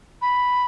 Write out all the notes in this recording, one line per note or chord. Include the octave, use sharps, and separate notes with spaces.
B5